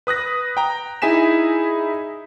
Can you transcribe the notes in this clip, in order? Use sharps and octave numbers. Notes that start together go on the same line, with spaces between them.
B4 D#6 F#6 A#6
G5 A#5
D#4 E4 G#4 G#5 B6 E7